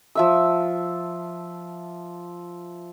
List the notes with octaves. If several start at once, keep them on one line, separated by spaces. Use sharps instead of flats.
F3 E5 E6